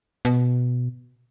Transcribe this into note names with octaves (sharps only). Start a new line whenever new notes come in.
B2